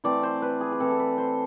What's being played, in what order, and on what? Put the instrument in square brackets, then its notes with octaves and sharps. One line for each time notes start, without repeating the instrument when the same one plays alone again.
[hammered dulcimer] E3 A3 C4 D5
C5
B4
G#4
G#4
E3 A3 C4 A4
A4
B4
C5